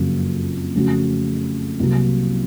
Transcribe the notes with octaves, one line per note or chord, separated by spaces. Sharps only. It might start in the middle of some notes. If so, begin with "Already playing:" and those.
Already playing: F#1 F2 C#3 F#3 A#3
F2 C#3 A3 C#4 F#4
C2 C3 F#3 A#3